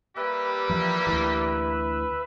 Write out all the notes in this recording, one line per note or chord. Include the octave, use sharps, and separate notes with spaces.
G3 A#3 G4 B4 E5
E3 F3
D2 E3